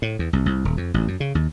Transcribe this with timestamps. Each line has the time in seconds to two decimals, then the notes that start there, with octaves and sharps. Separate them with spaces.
0.02 A2
0.19 E2
0.33 C2
0.46 C2
0.65 D#1
0.77 F2
0.94 A1
1.08 F#2
1.20 C#3
1.35 D#2